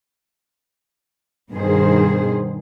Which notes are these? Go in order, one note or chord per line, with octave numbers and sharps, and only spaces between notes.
G2 B2 D#3 G#4 C5